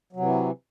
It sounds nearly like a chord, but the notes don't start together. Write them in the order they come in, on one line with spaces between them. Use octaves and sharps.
F#3 C3 E3